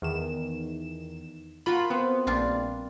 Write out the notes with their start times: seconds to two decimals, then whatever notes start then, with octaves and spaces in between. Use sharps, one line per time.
0.02 E2 D#3 E7
1.66 A#3 F4 F#4 B5
1.90 B3 C4
2.27 A#1 G3 D4 F4